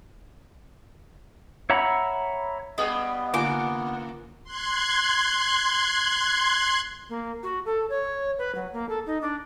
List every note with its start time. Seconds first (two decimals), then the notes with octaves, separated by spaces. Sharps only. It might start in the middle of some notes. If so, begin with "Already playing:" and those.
1.70 C#5 E5 F#5 A#5 B5
2.78 G2 G3 B3 G#4 D#5
3.34 C#3 A#3 F4 G#5 D6
4.44 C6 F#6 G#6
7.09 A#3
7.43 F#4
7.65 A4
7.90 C#5
8.38 B4
8.55 F#3
8.73 A#3
8.89 A4
9.06 D#4
9.22 D4